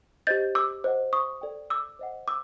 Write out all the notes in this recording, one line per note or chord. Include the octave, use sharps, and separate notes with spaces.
G4 C5 D#5 G6 A6
D6 E6
C5 D#5 F#5
C#6 D#6
A4 D5 G5
D6 E6
C5 D#5 F#5
D6 E6